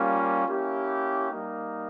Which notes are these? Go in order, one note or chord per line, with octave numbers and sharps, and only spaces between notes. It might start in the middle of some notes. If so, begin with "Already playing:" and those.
Already playing: G3 A#3 C#4 F4
A#3 C#4 E4 G4
G3 A#3 D#4